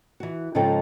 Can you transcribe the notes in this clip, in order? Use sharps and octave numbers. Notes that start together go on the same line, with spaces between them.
E3 F#4
G#2 C#3 F3 D#4 A4 G5